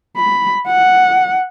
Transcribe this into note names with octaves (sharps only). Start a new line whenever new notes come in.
B5
F#5